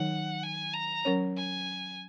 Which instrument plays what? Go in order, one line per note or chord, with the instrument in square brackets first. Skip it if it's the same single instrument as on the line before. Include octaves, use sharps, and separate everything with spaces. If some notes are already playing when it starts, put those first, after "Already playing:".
Already playing: [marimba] D#3 F#3 D#4 A#4 C#5 [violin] F#5
[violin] G#5
A#5
[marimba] F#3 C#4 A#4 C#5
[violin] G#5